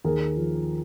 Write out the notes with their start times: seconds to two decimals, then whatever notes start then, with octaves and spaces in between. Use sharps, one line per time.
0.04 D#2 G#4 A#4
0.37 F3